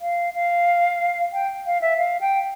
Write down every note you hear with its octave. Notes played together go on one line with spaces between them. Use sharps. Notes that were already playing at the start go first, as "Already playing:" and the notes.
F5
F5
G5
F5
E5
F5
G5